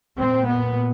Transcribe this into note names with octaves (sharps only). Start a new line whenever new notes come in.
A#2 C4
B3